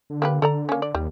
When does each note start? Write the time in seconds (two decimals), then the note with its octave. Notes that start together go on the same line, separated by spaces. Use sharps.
0.10 D3
0.22 A#3 G4 B4
0.42 D3 A4 D5 A#5
0.69 A#3 C#4
0.82 D5
0.95 D#2 G3